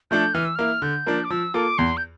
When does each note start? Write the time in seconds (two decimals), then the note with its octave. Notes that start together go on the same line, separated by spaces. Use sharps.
0.11 F3 A3 D4 A4 G6
0.34 E3 F6
0.45 E6
0.56 A#3 E4 F6
0.82 D3 G6
1.06 F3 A#3 D4
1.24 D6
1.30 F3 E6
1.54 A#3 F4 A4 D6
1.78 E2 C6
1.97 G6